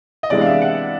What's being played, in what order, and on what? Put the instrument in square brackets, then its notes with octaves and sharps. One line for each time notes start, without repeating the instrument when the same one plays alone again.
[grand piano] D#5
[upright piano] C3 E3 G#3 B3 D4 [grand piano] D5
[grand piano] F5
E5
F#5